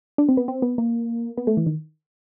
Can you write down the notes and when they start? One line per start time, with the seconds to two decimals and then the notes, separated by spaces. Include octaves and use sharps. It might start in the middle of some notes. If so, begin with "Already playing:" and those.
0.18 D4
0.29 C4
0.37 B3
0.48 C4
0.62 B3
0.78 A#3
1.37 B3
1.47 A3
1.57 E3
1.66 D#3